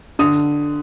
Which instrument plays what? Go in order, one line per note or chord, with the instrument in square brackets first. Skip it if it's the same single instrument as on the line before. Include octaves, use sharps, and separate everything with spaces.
[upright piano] D3 D#6